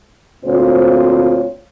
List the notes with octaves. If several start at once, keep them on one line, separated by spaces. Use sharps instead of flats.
D2 A#2 C4 F4 C5 C#5